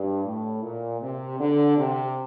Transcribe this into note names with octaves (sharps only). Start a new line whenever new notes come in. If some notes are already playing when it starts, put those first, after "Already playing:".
Already playing: G2
A2
A#2
C3
D3
C3